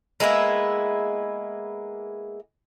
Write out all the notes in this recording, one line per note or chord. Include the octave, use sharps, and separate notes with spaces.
G#3 A#3 B3 E4